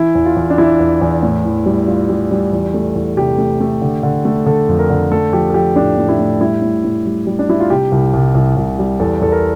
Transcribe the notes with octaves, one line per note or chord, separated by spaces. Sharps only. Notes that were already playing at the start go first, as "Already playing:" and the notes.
Already playing: E3 E4
E2
F4
E2
D4
E3 E4
E2
E2
A2
E3
G3
G3 F4
G3
G3
E2
A3
E2
C3 G4
A3
A3
D3
D3
A3
D3 A4
F2
A#4
D3
A3 A4
F3 G4
A4
F3 G4
A2 D4
A2
E4
A2
G3 E4
A2
A2
G3
G3
D4
G3 E4
F4
C3 G4
C2
C2
C2
C2
G3
E2 A4
E2 A4
A#4